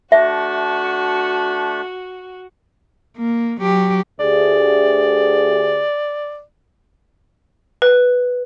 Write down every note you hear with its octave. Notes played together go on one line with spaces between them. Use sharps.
A3 D4 F#4 E5
A#3
F#3 G4
D2 G4 G#4 D5
B4